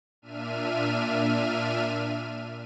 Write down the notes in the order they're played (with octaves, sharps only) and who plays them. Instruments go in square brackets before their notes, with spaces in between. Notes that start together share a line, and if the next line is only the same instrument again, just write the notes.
[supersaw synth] A#2 D4 E5 F6 D#7